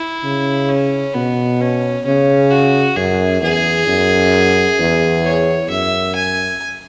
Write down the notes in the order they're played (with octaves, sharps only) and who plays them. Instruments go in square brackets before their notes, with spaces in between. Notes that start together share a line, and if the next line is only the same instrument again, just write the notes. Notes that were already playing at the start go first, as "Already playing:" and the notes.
Already playing: [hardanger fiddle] E4
[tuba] C#3
[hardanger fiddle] C#4
[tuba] B2 [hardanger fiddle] B3
[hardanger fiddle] C#4
[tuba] C#3 [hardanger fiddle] C#4
[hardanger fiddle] F#4
[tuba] F#2 [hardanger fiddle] G#4
[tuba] E2 [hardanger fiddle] G#4
[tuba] F#2
E2
[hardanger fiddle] C#5
[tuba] F#2 [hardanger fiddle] E5
[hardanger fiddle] G#5